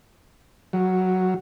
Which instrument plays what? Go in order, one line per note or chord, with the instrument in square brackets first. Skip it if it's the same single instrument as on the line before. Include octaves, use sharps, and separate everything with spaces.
[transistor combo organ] F#3